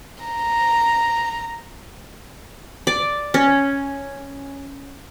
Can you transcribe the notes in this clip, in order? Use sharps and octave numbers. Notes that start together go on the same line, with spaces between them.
A#5
D5
C#4